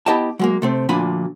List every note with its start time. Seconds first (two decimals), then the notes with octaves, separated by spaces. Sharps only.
0.06 B3 E4 G4 D#5 G5 A5
0.39 F#3 G#3 A#3
0.62 C3 A3 C4
0.89 D2 A#2 F3 D4 G#5 B5